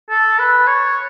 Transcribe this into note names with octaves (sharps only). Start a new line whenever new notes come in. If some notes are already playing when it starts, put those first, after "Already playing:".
A4
B4
C#5